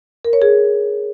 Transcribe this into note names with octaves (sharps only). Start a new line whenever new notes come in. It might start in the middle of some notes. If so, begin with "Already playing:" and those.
A#4
C#5
G#4